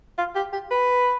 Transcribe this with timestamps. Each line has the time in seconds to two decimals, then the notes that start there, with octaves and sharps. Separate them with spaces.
0.18 F4
0.35 G4
0.53 G4
0.71 B4